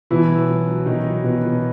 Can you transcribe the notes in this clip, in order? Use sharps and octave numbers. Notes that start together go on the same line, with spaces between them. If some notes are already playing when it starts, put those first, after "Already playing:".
B2 E3 E4
F#3
F#3
F#3
B2 D#3 D#4
F#3
B2 F#3 B3
B2